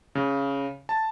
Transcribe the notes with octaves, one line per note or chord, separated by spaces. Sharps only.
C#3
A5